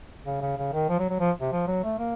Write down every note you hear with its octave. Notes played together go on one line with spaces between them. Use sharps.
C#3
C#3
C#3
D#3
F3
F#3
F#3
F3
C3
F3
F#3
A3
A#3